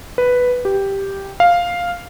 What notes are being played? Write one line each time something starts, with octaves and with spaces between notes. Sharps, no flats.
B4
G4
F5